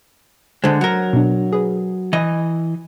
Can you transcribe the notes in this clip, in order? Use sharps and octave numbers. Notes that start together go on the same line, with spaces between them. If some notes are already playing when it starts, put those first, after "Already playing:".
D3 G#3 C5 G6
F#3 A#4
B2 D4
G#4 B4
E3 D#5